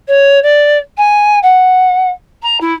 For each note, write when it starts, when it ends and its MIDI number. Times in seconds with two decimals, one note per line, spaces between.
0.07 0.41 73
0.42 0.78 74
0.97 1.39 80
1.42 2.10 78
2.42 2.59 82
2.60 2.74 64